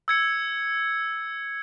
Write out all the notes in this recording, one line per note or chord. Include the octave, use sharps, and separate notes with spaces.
E6 G#6 C#7